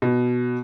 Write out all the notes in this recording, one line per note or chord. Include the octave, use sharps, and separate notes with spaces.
B2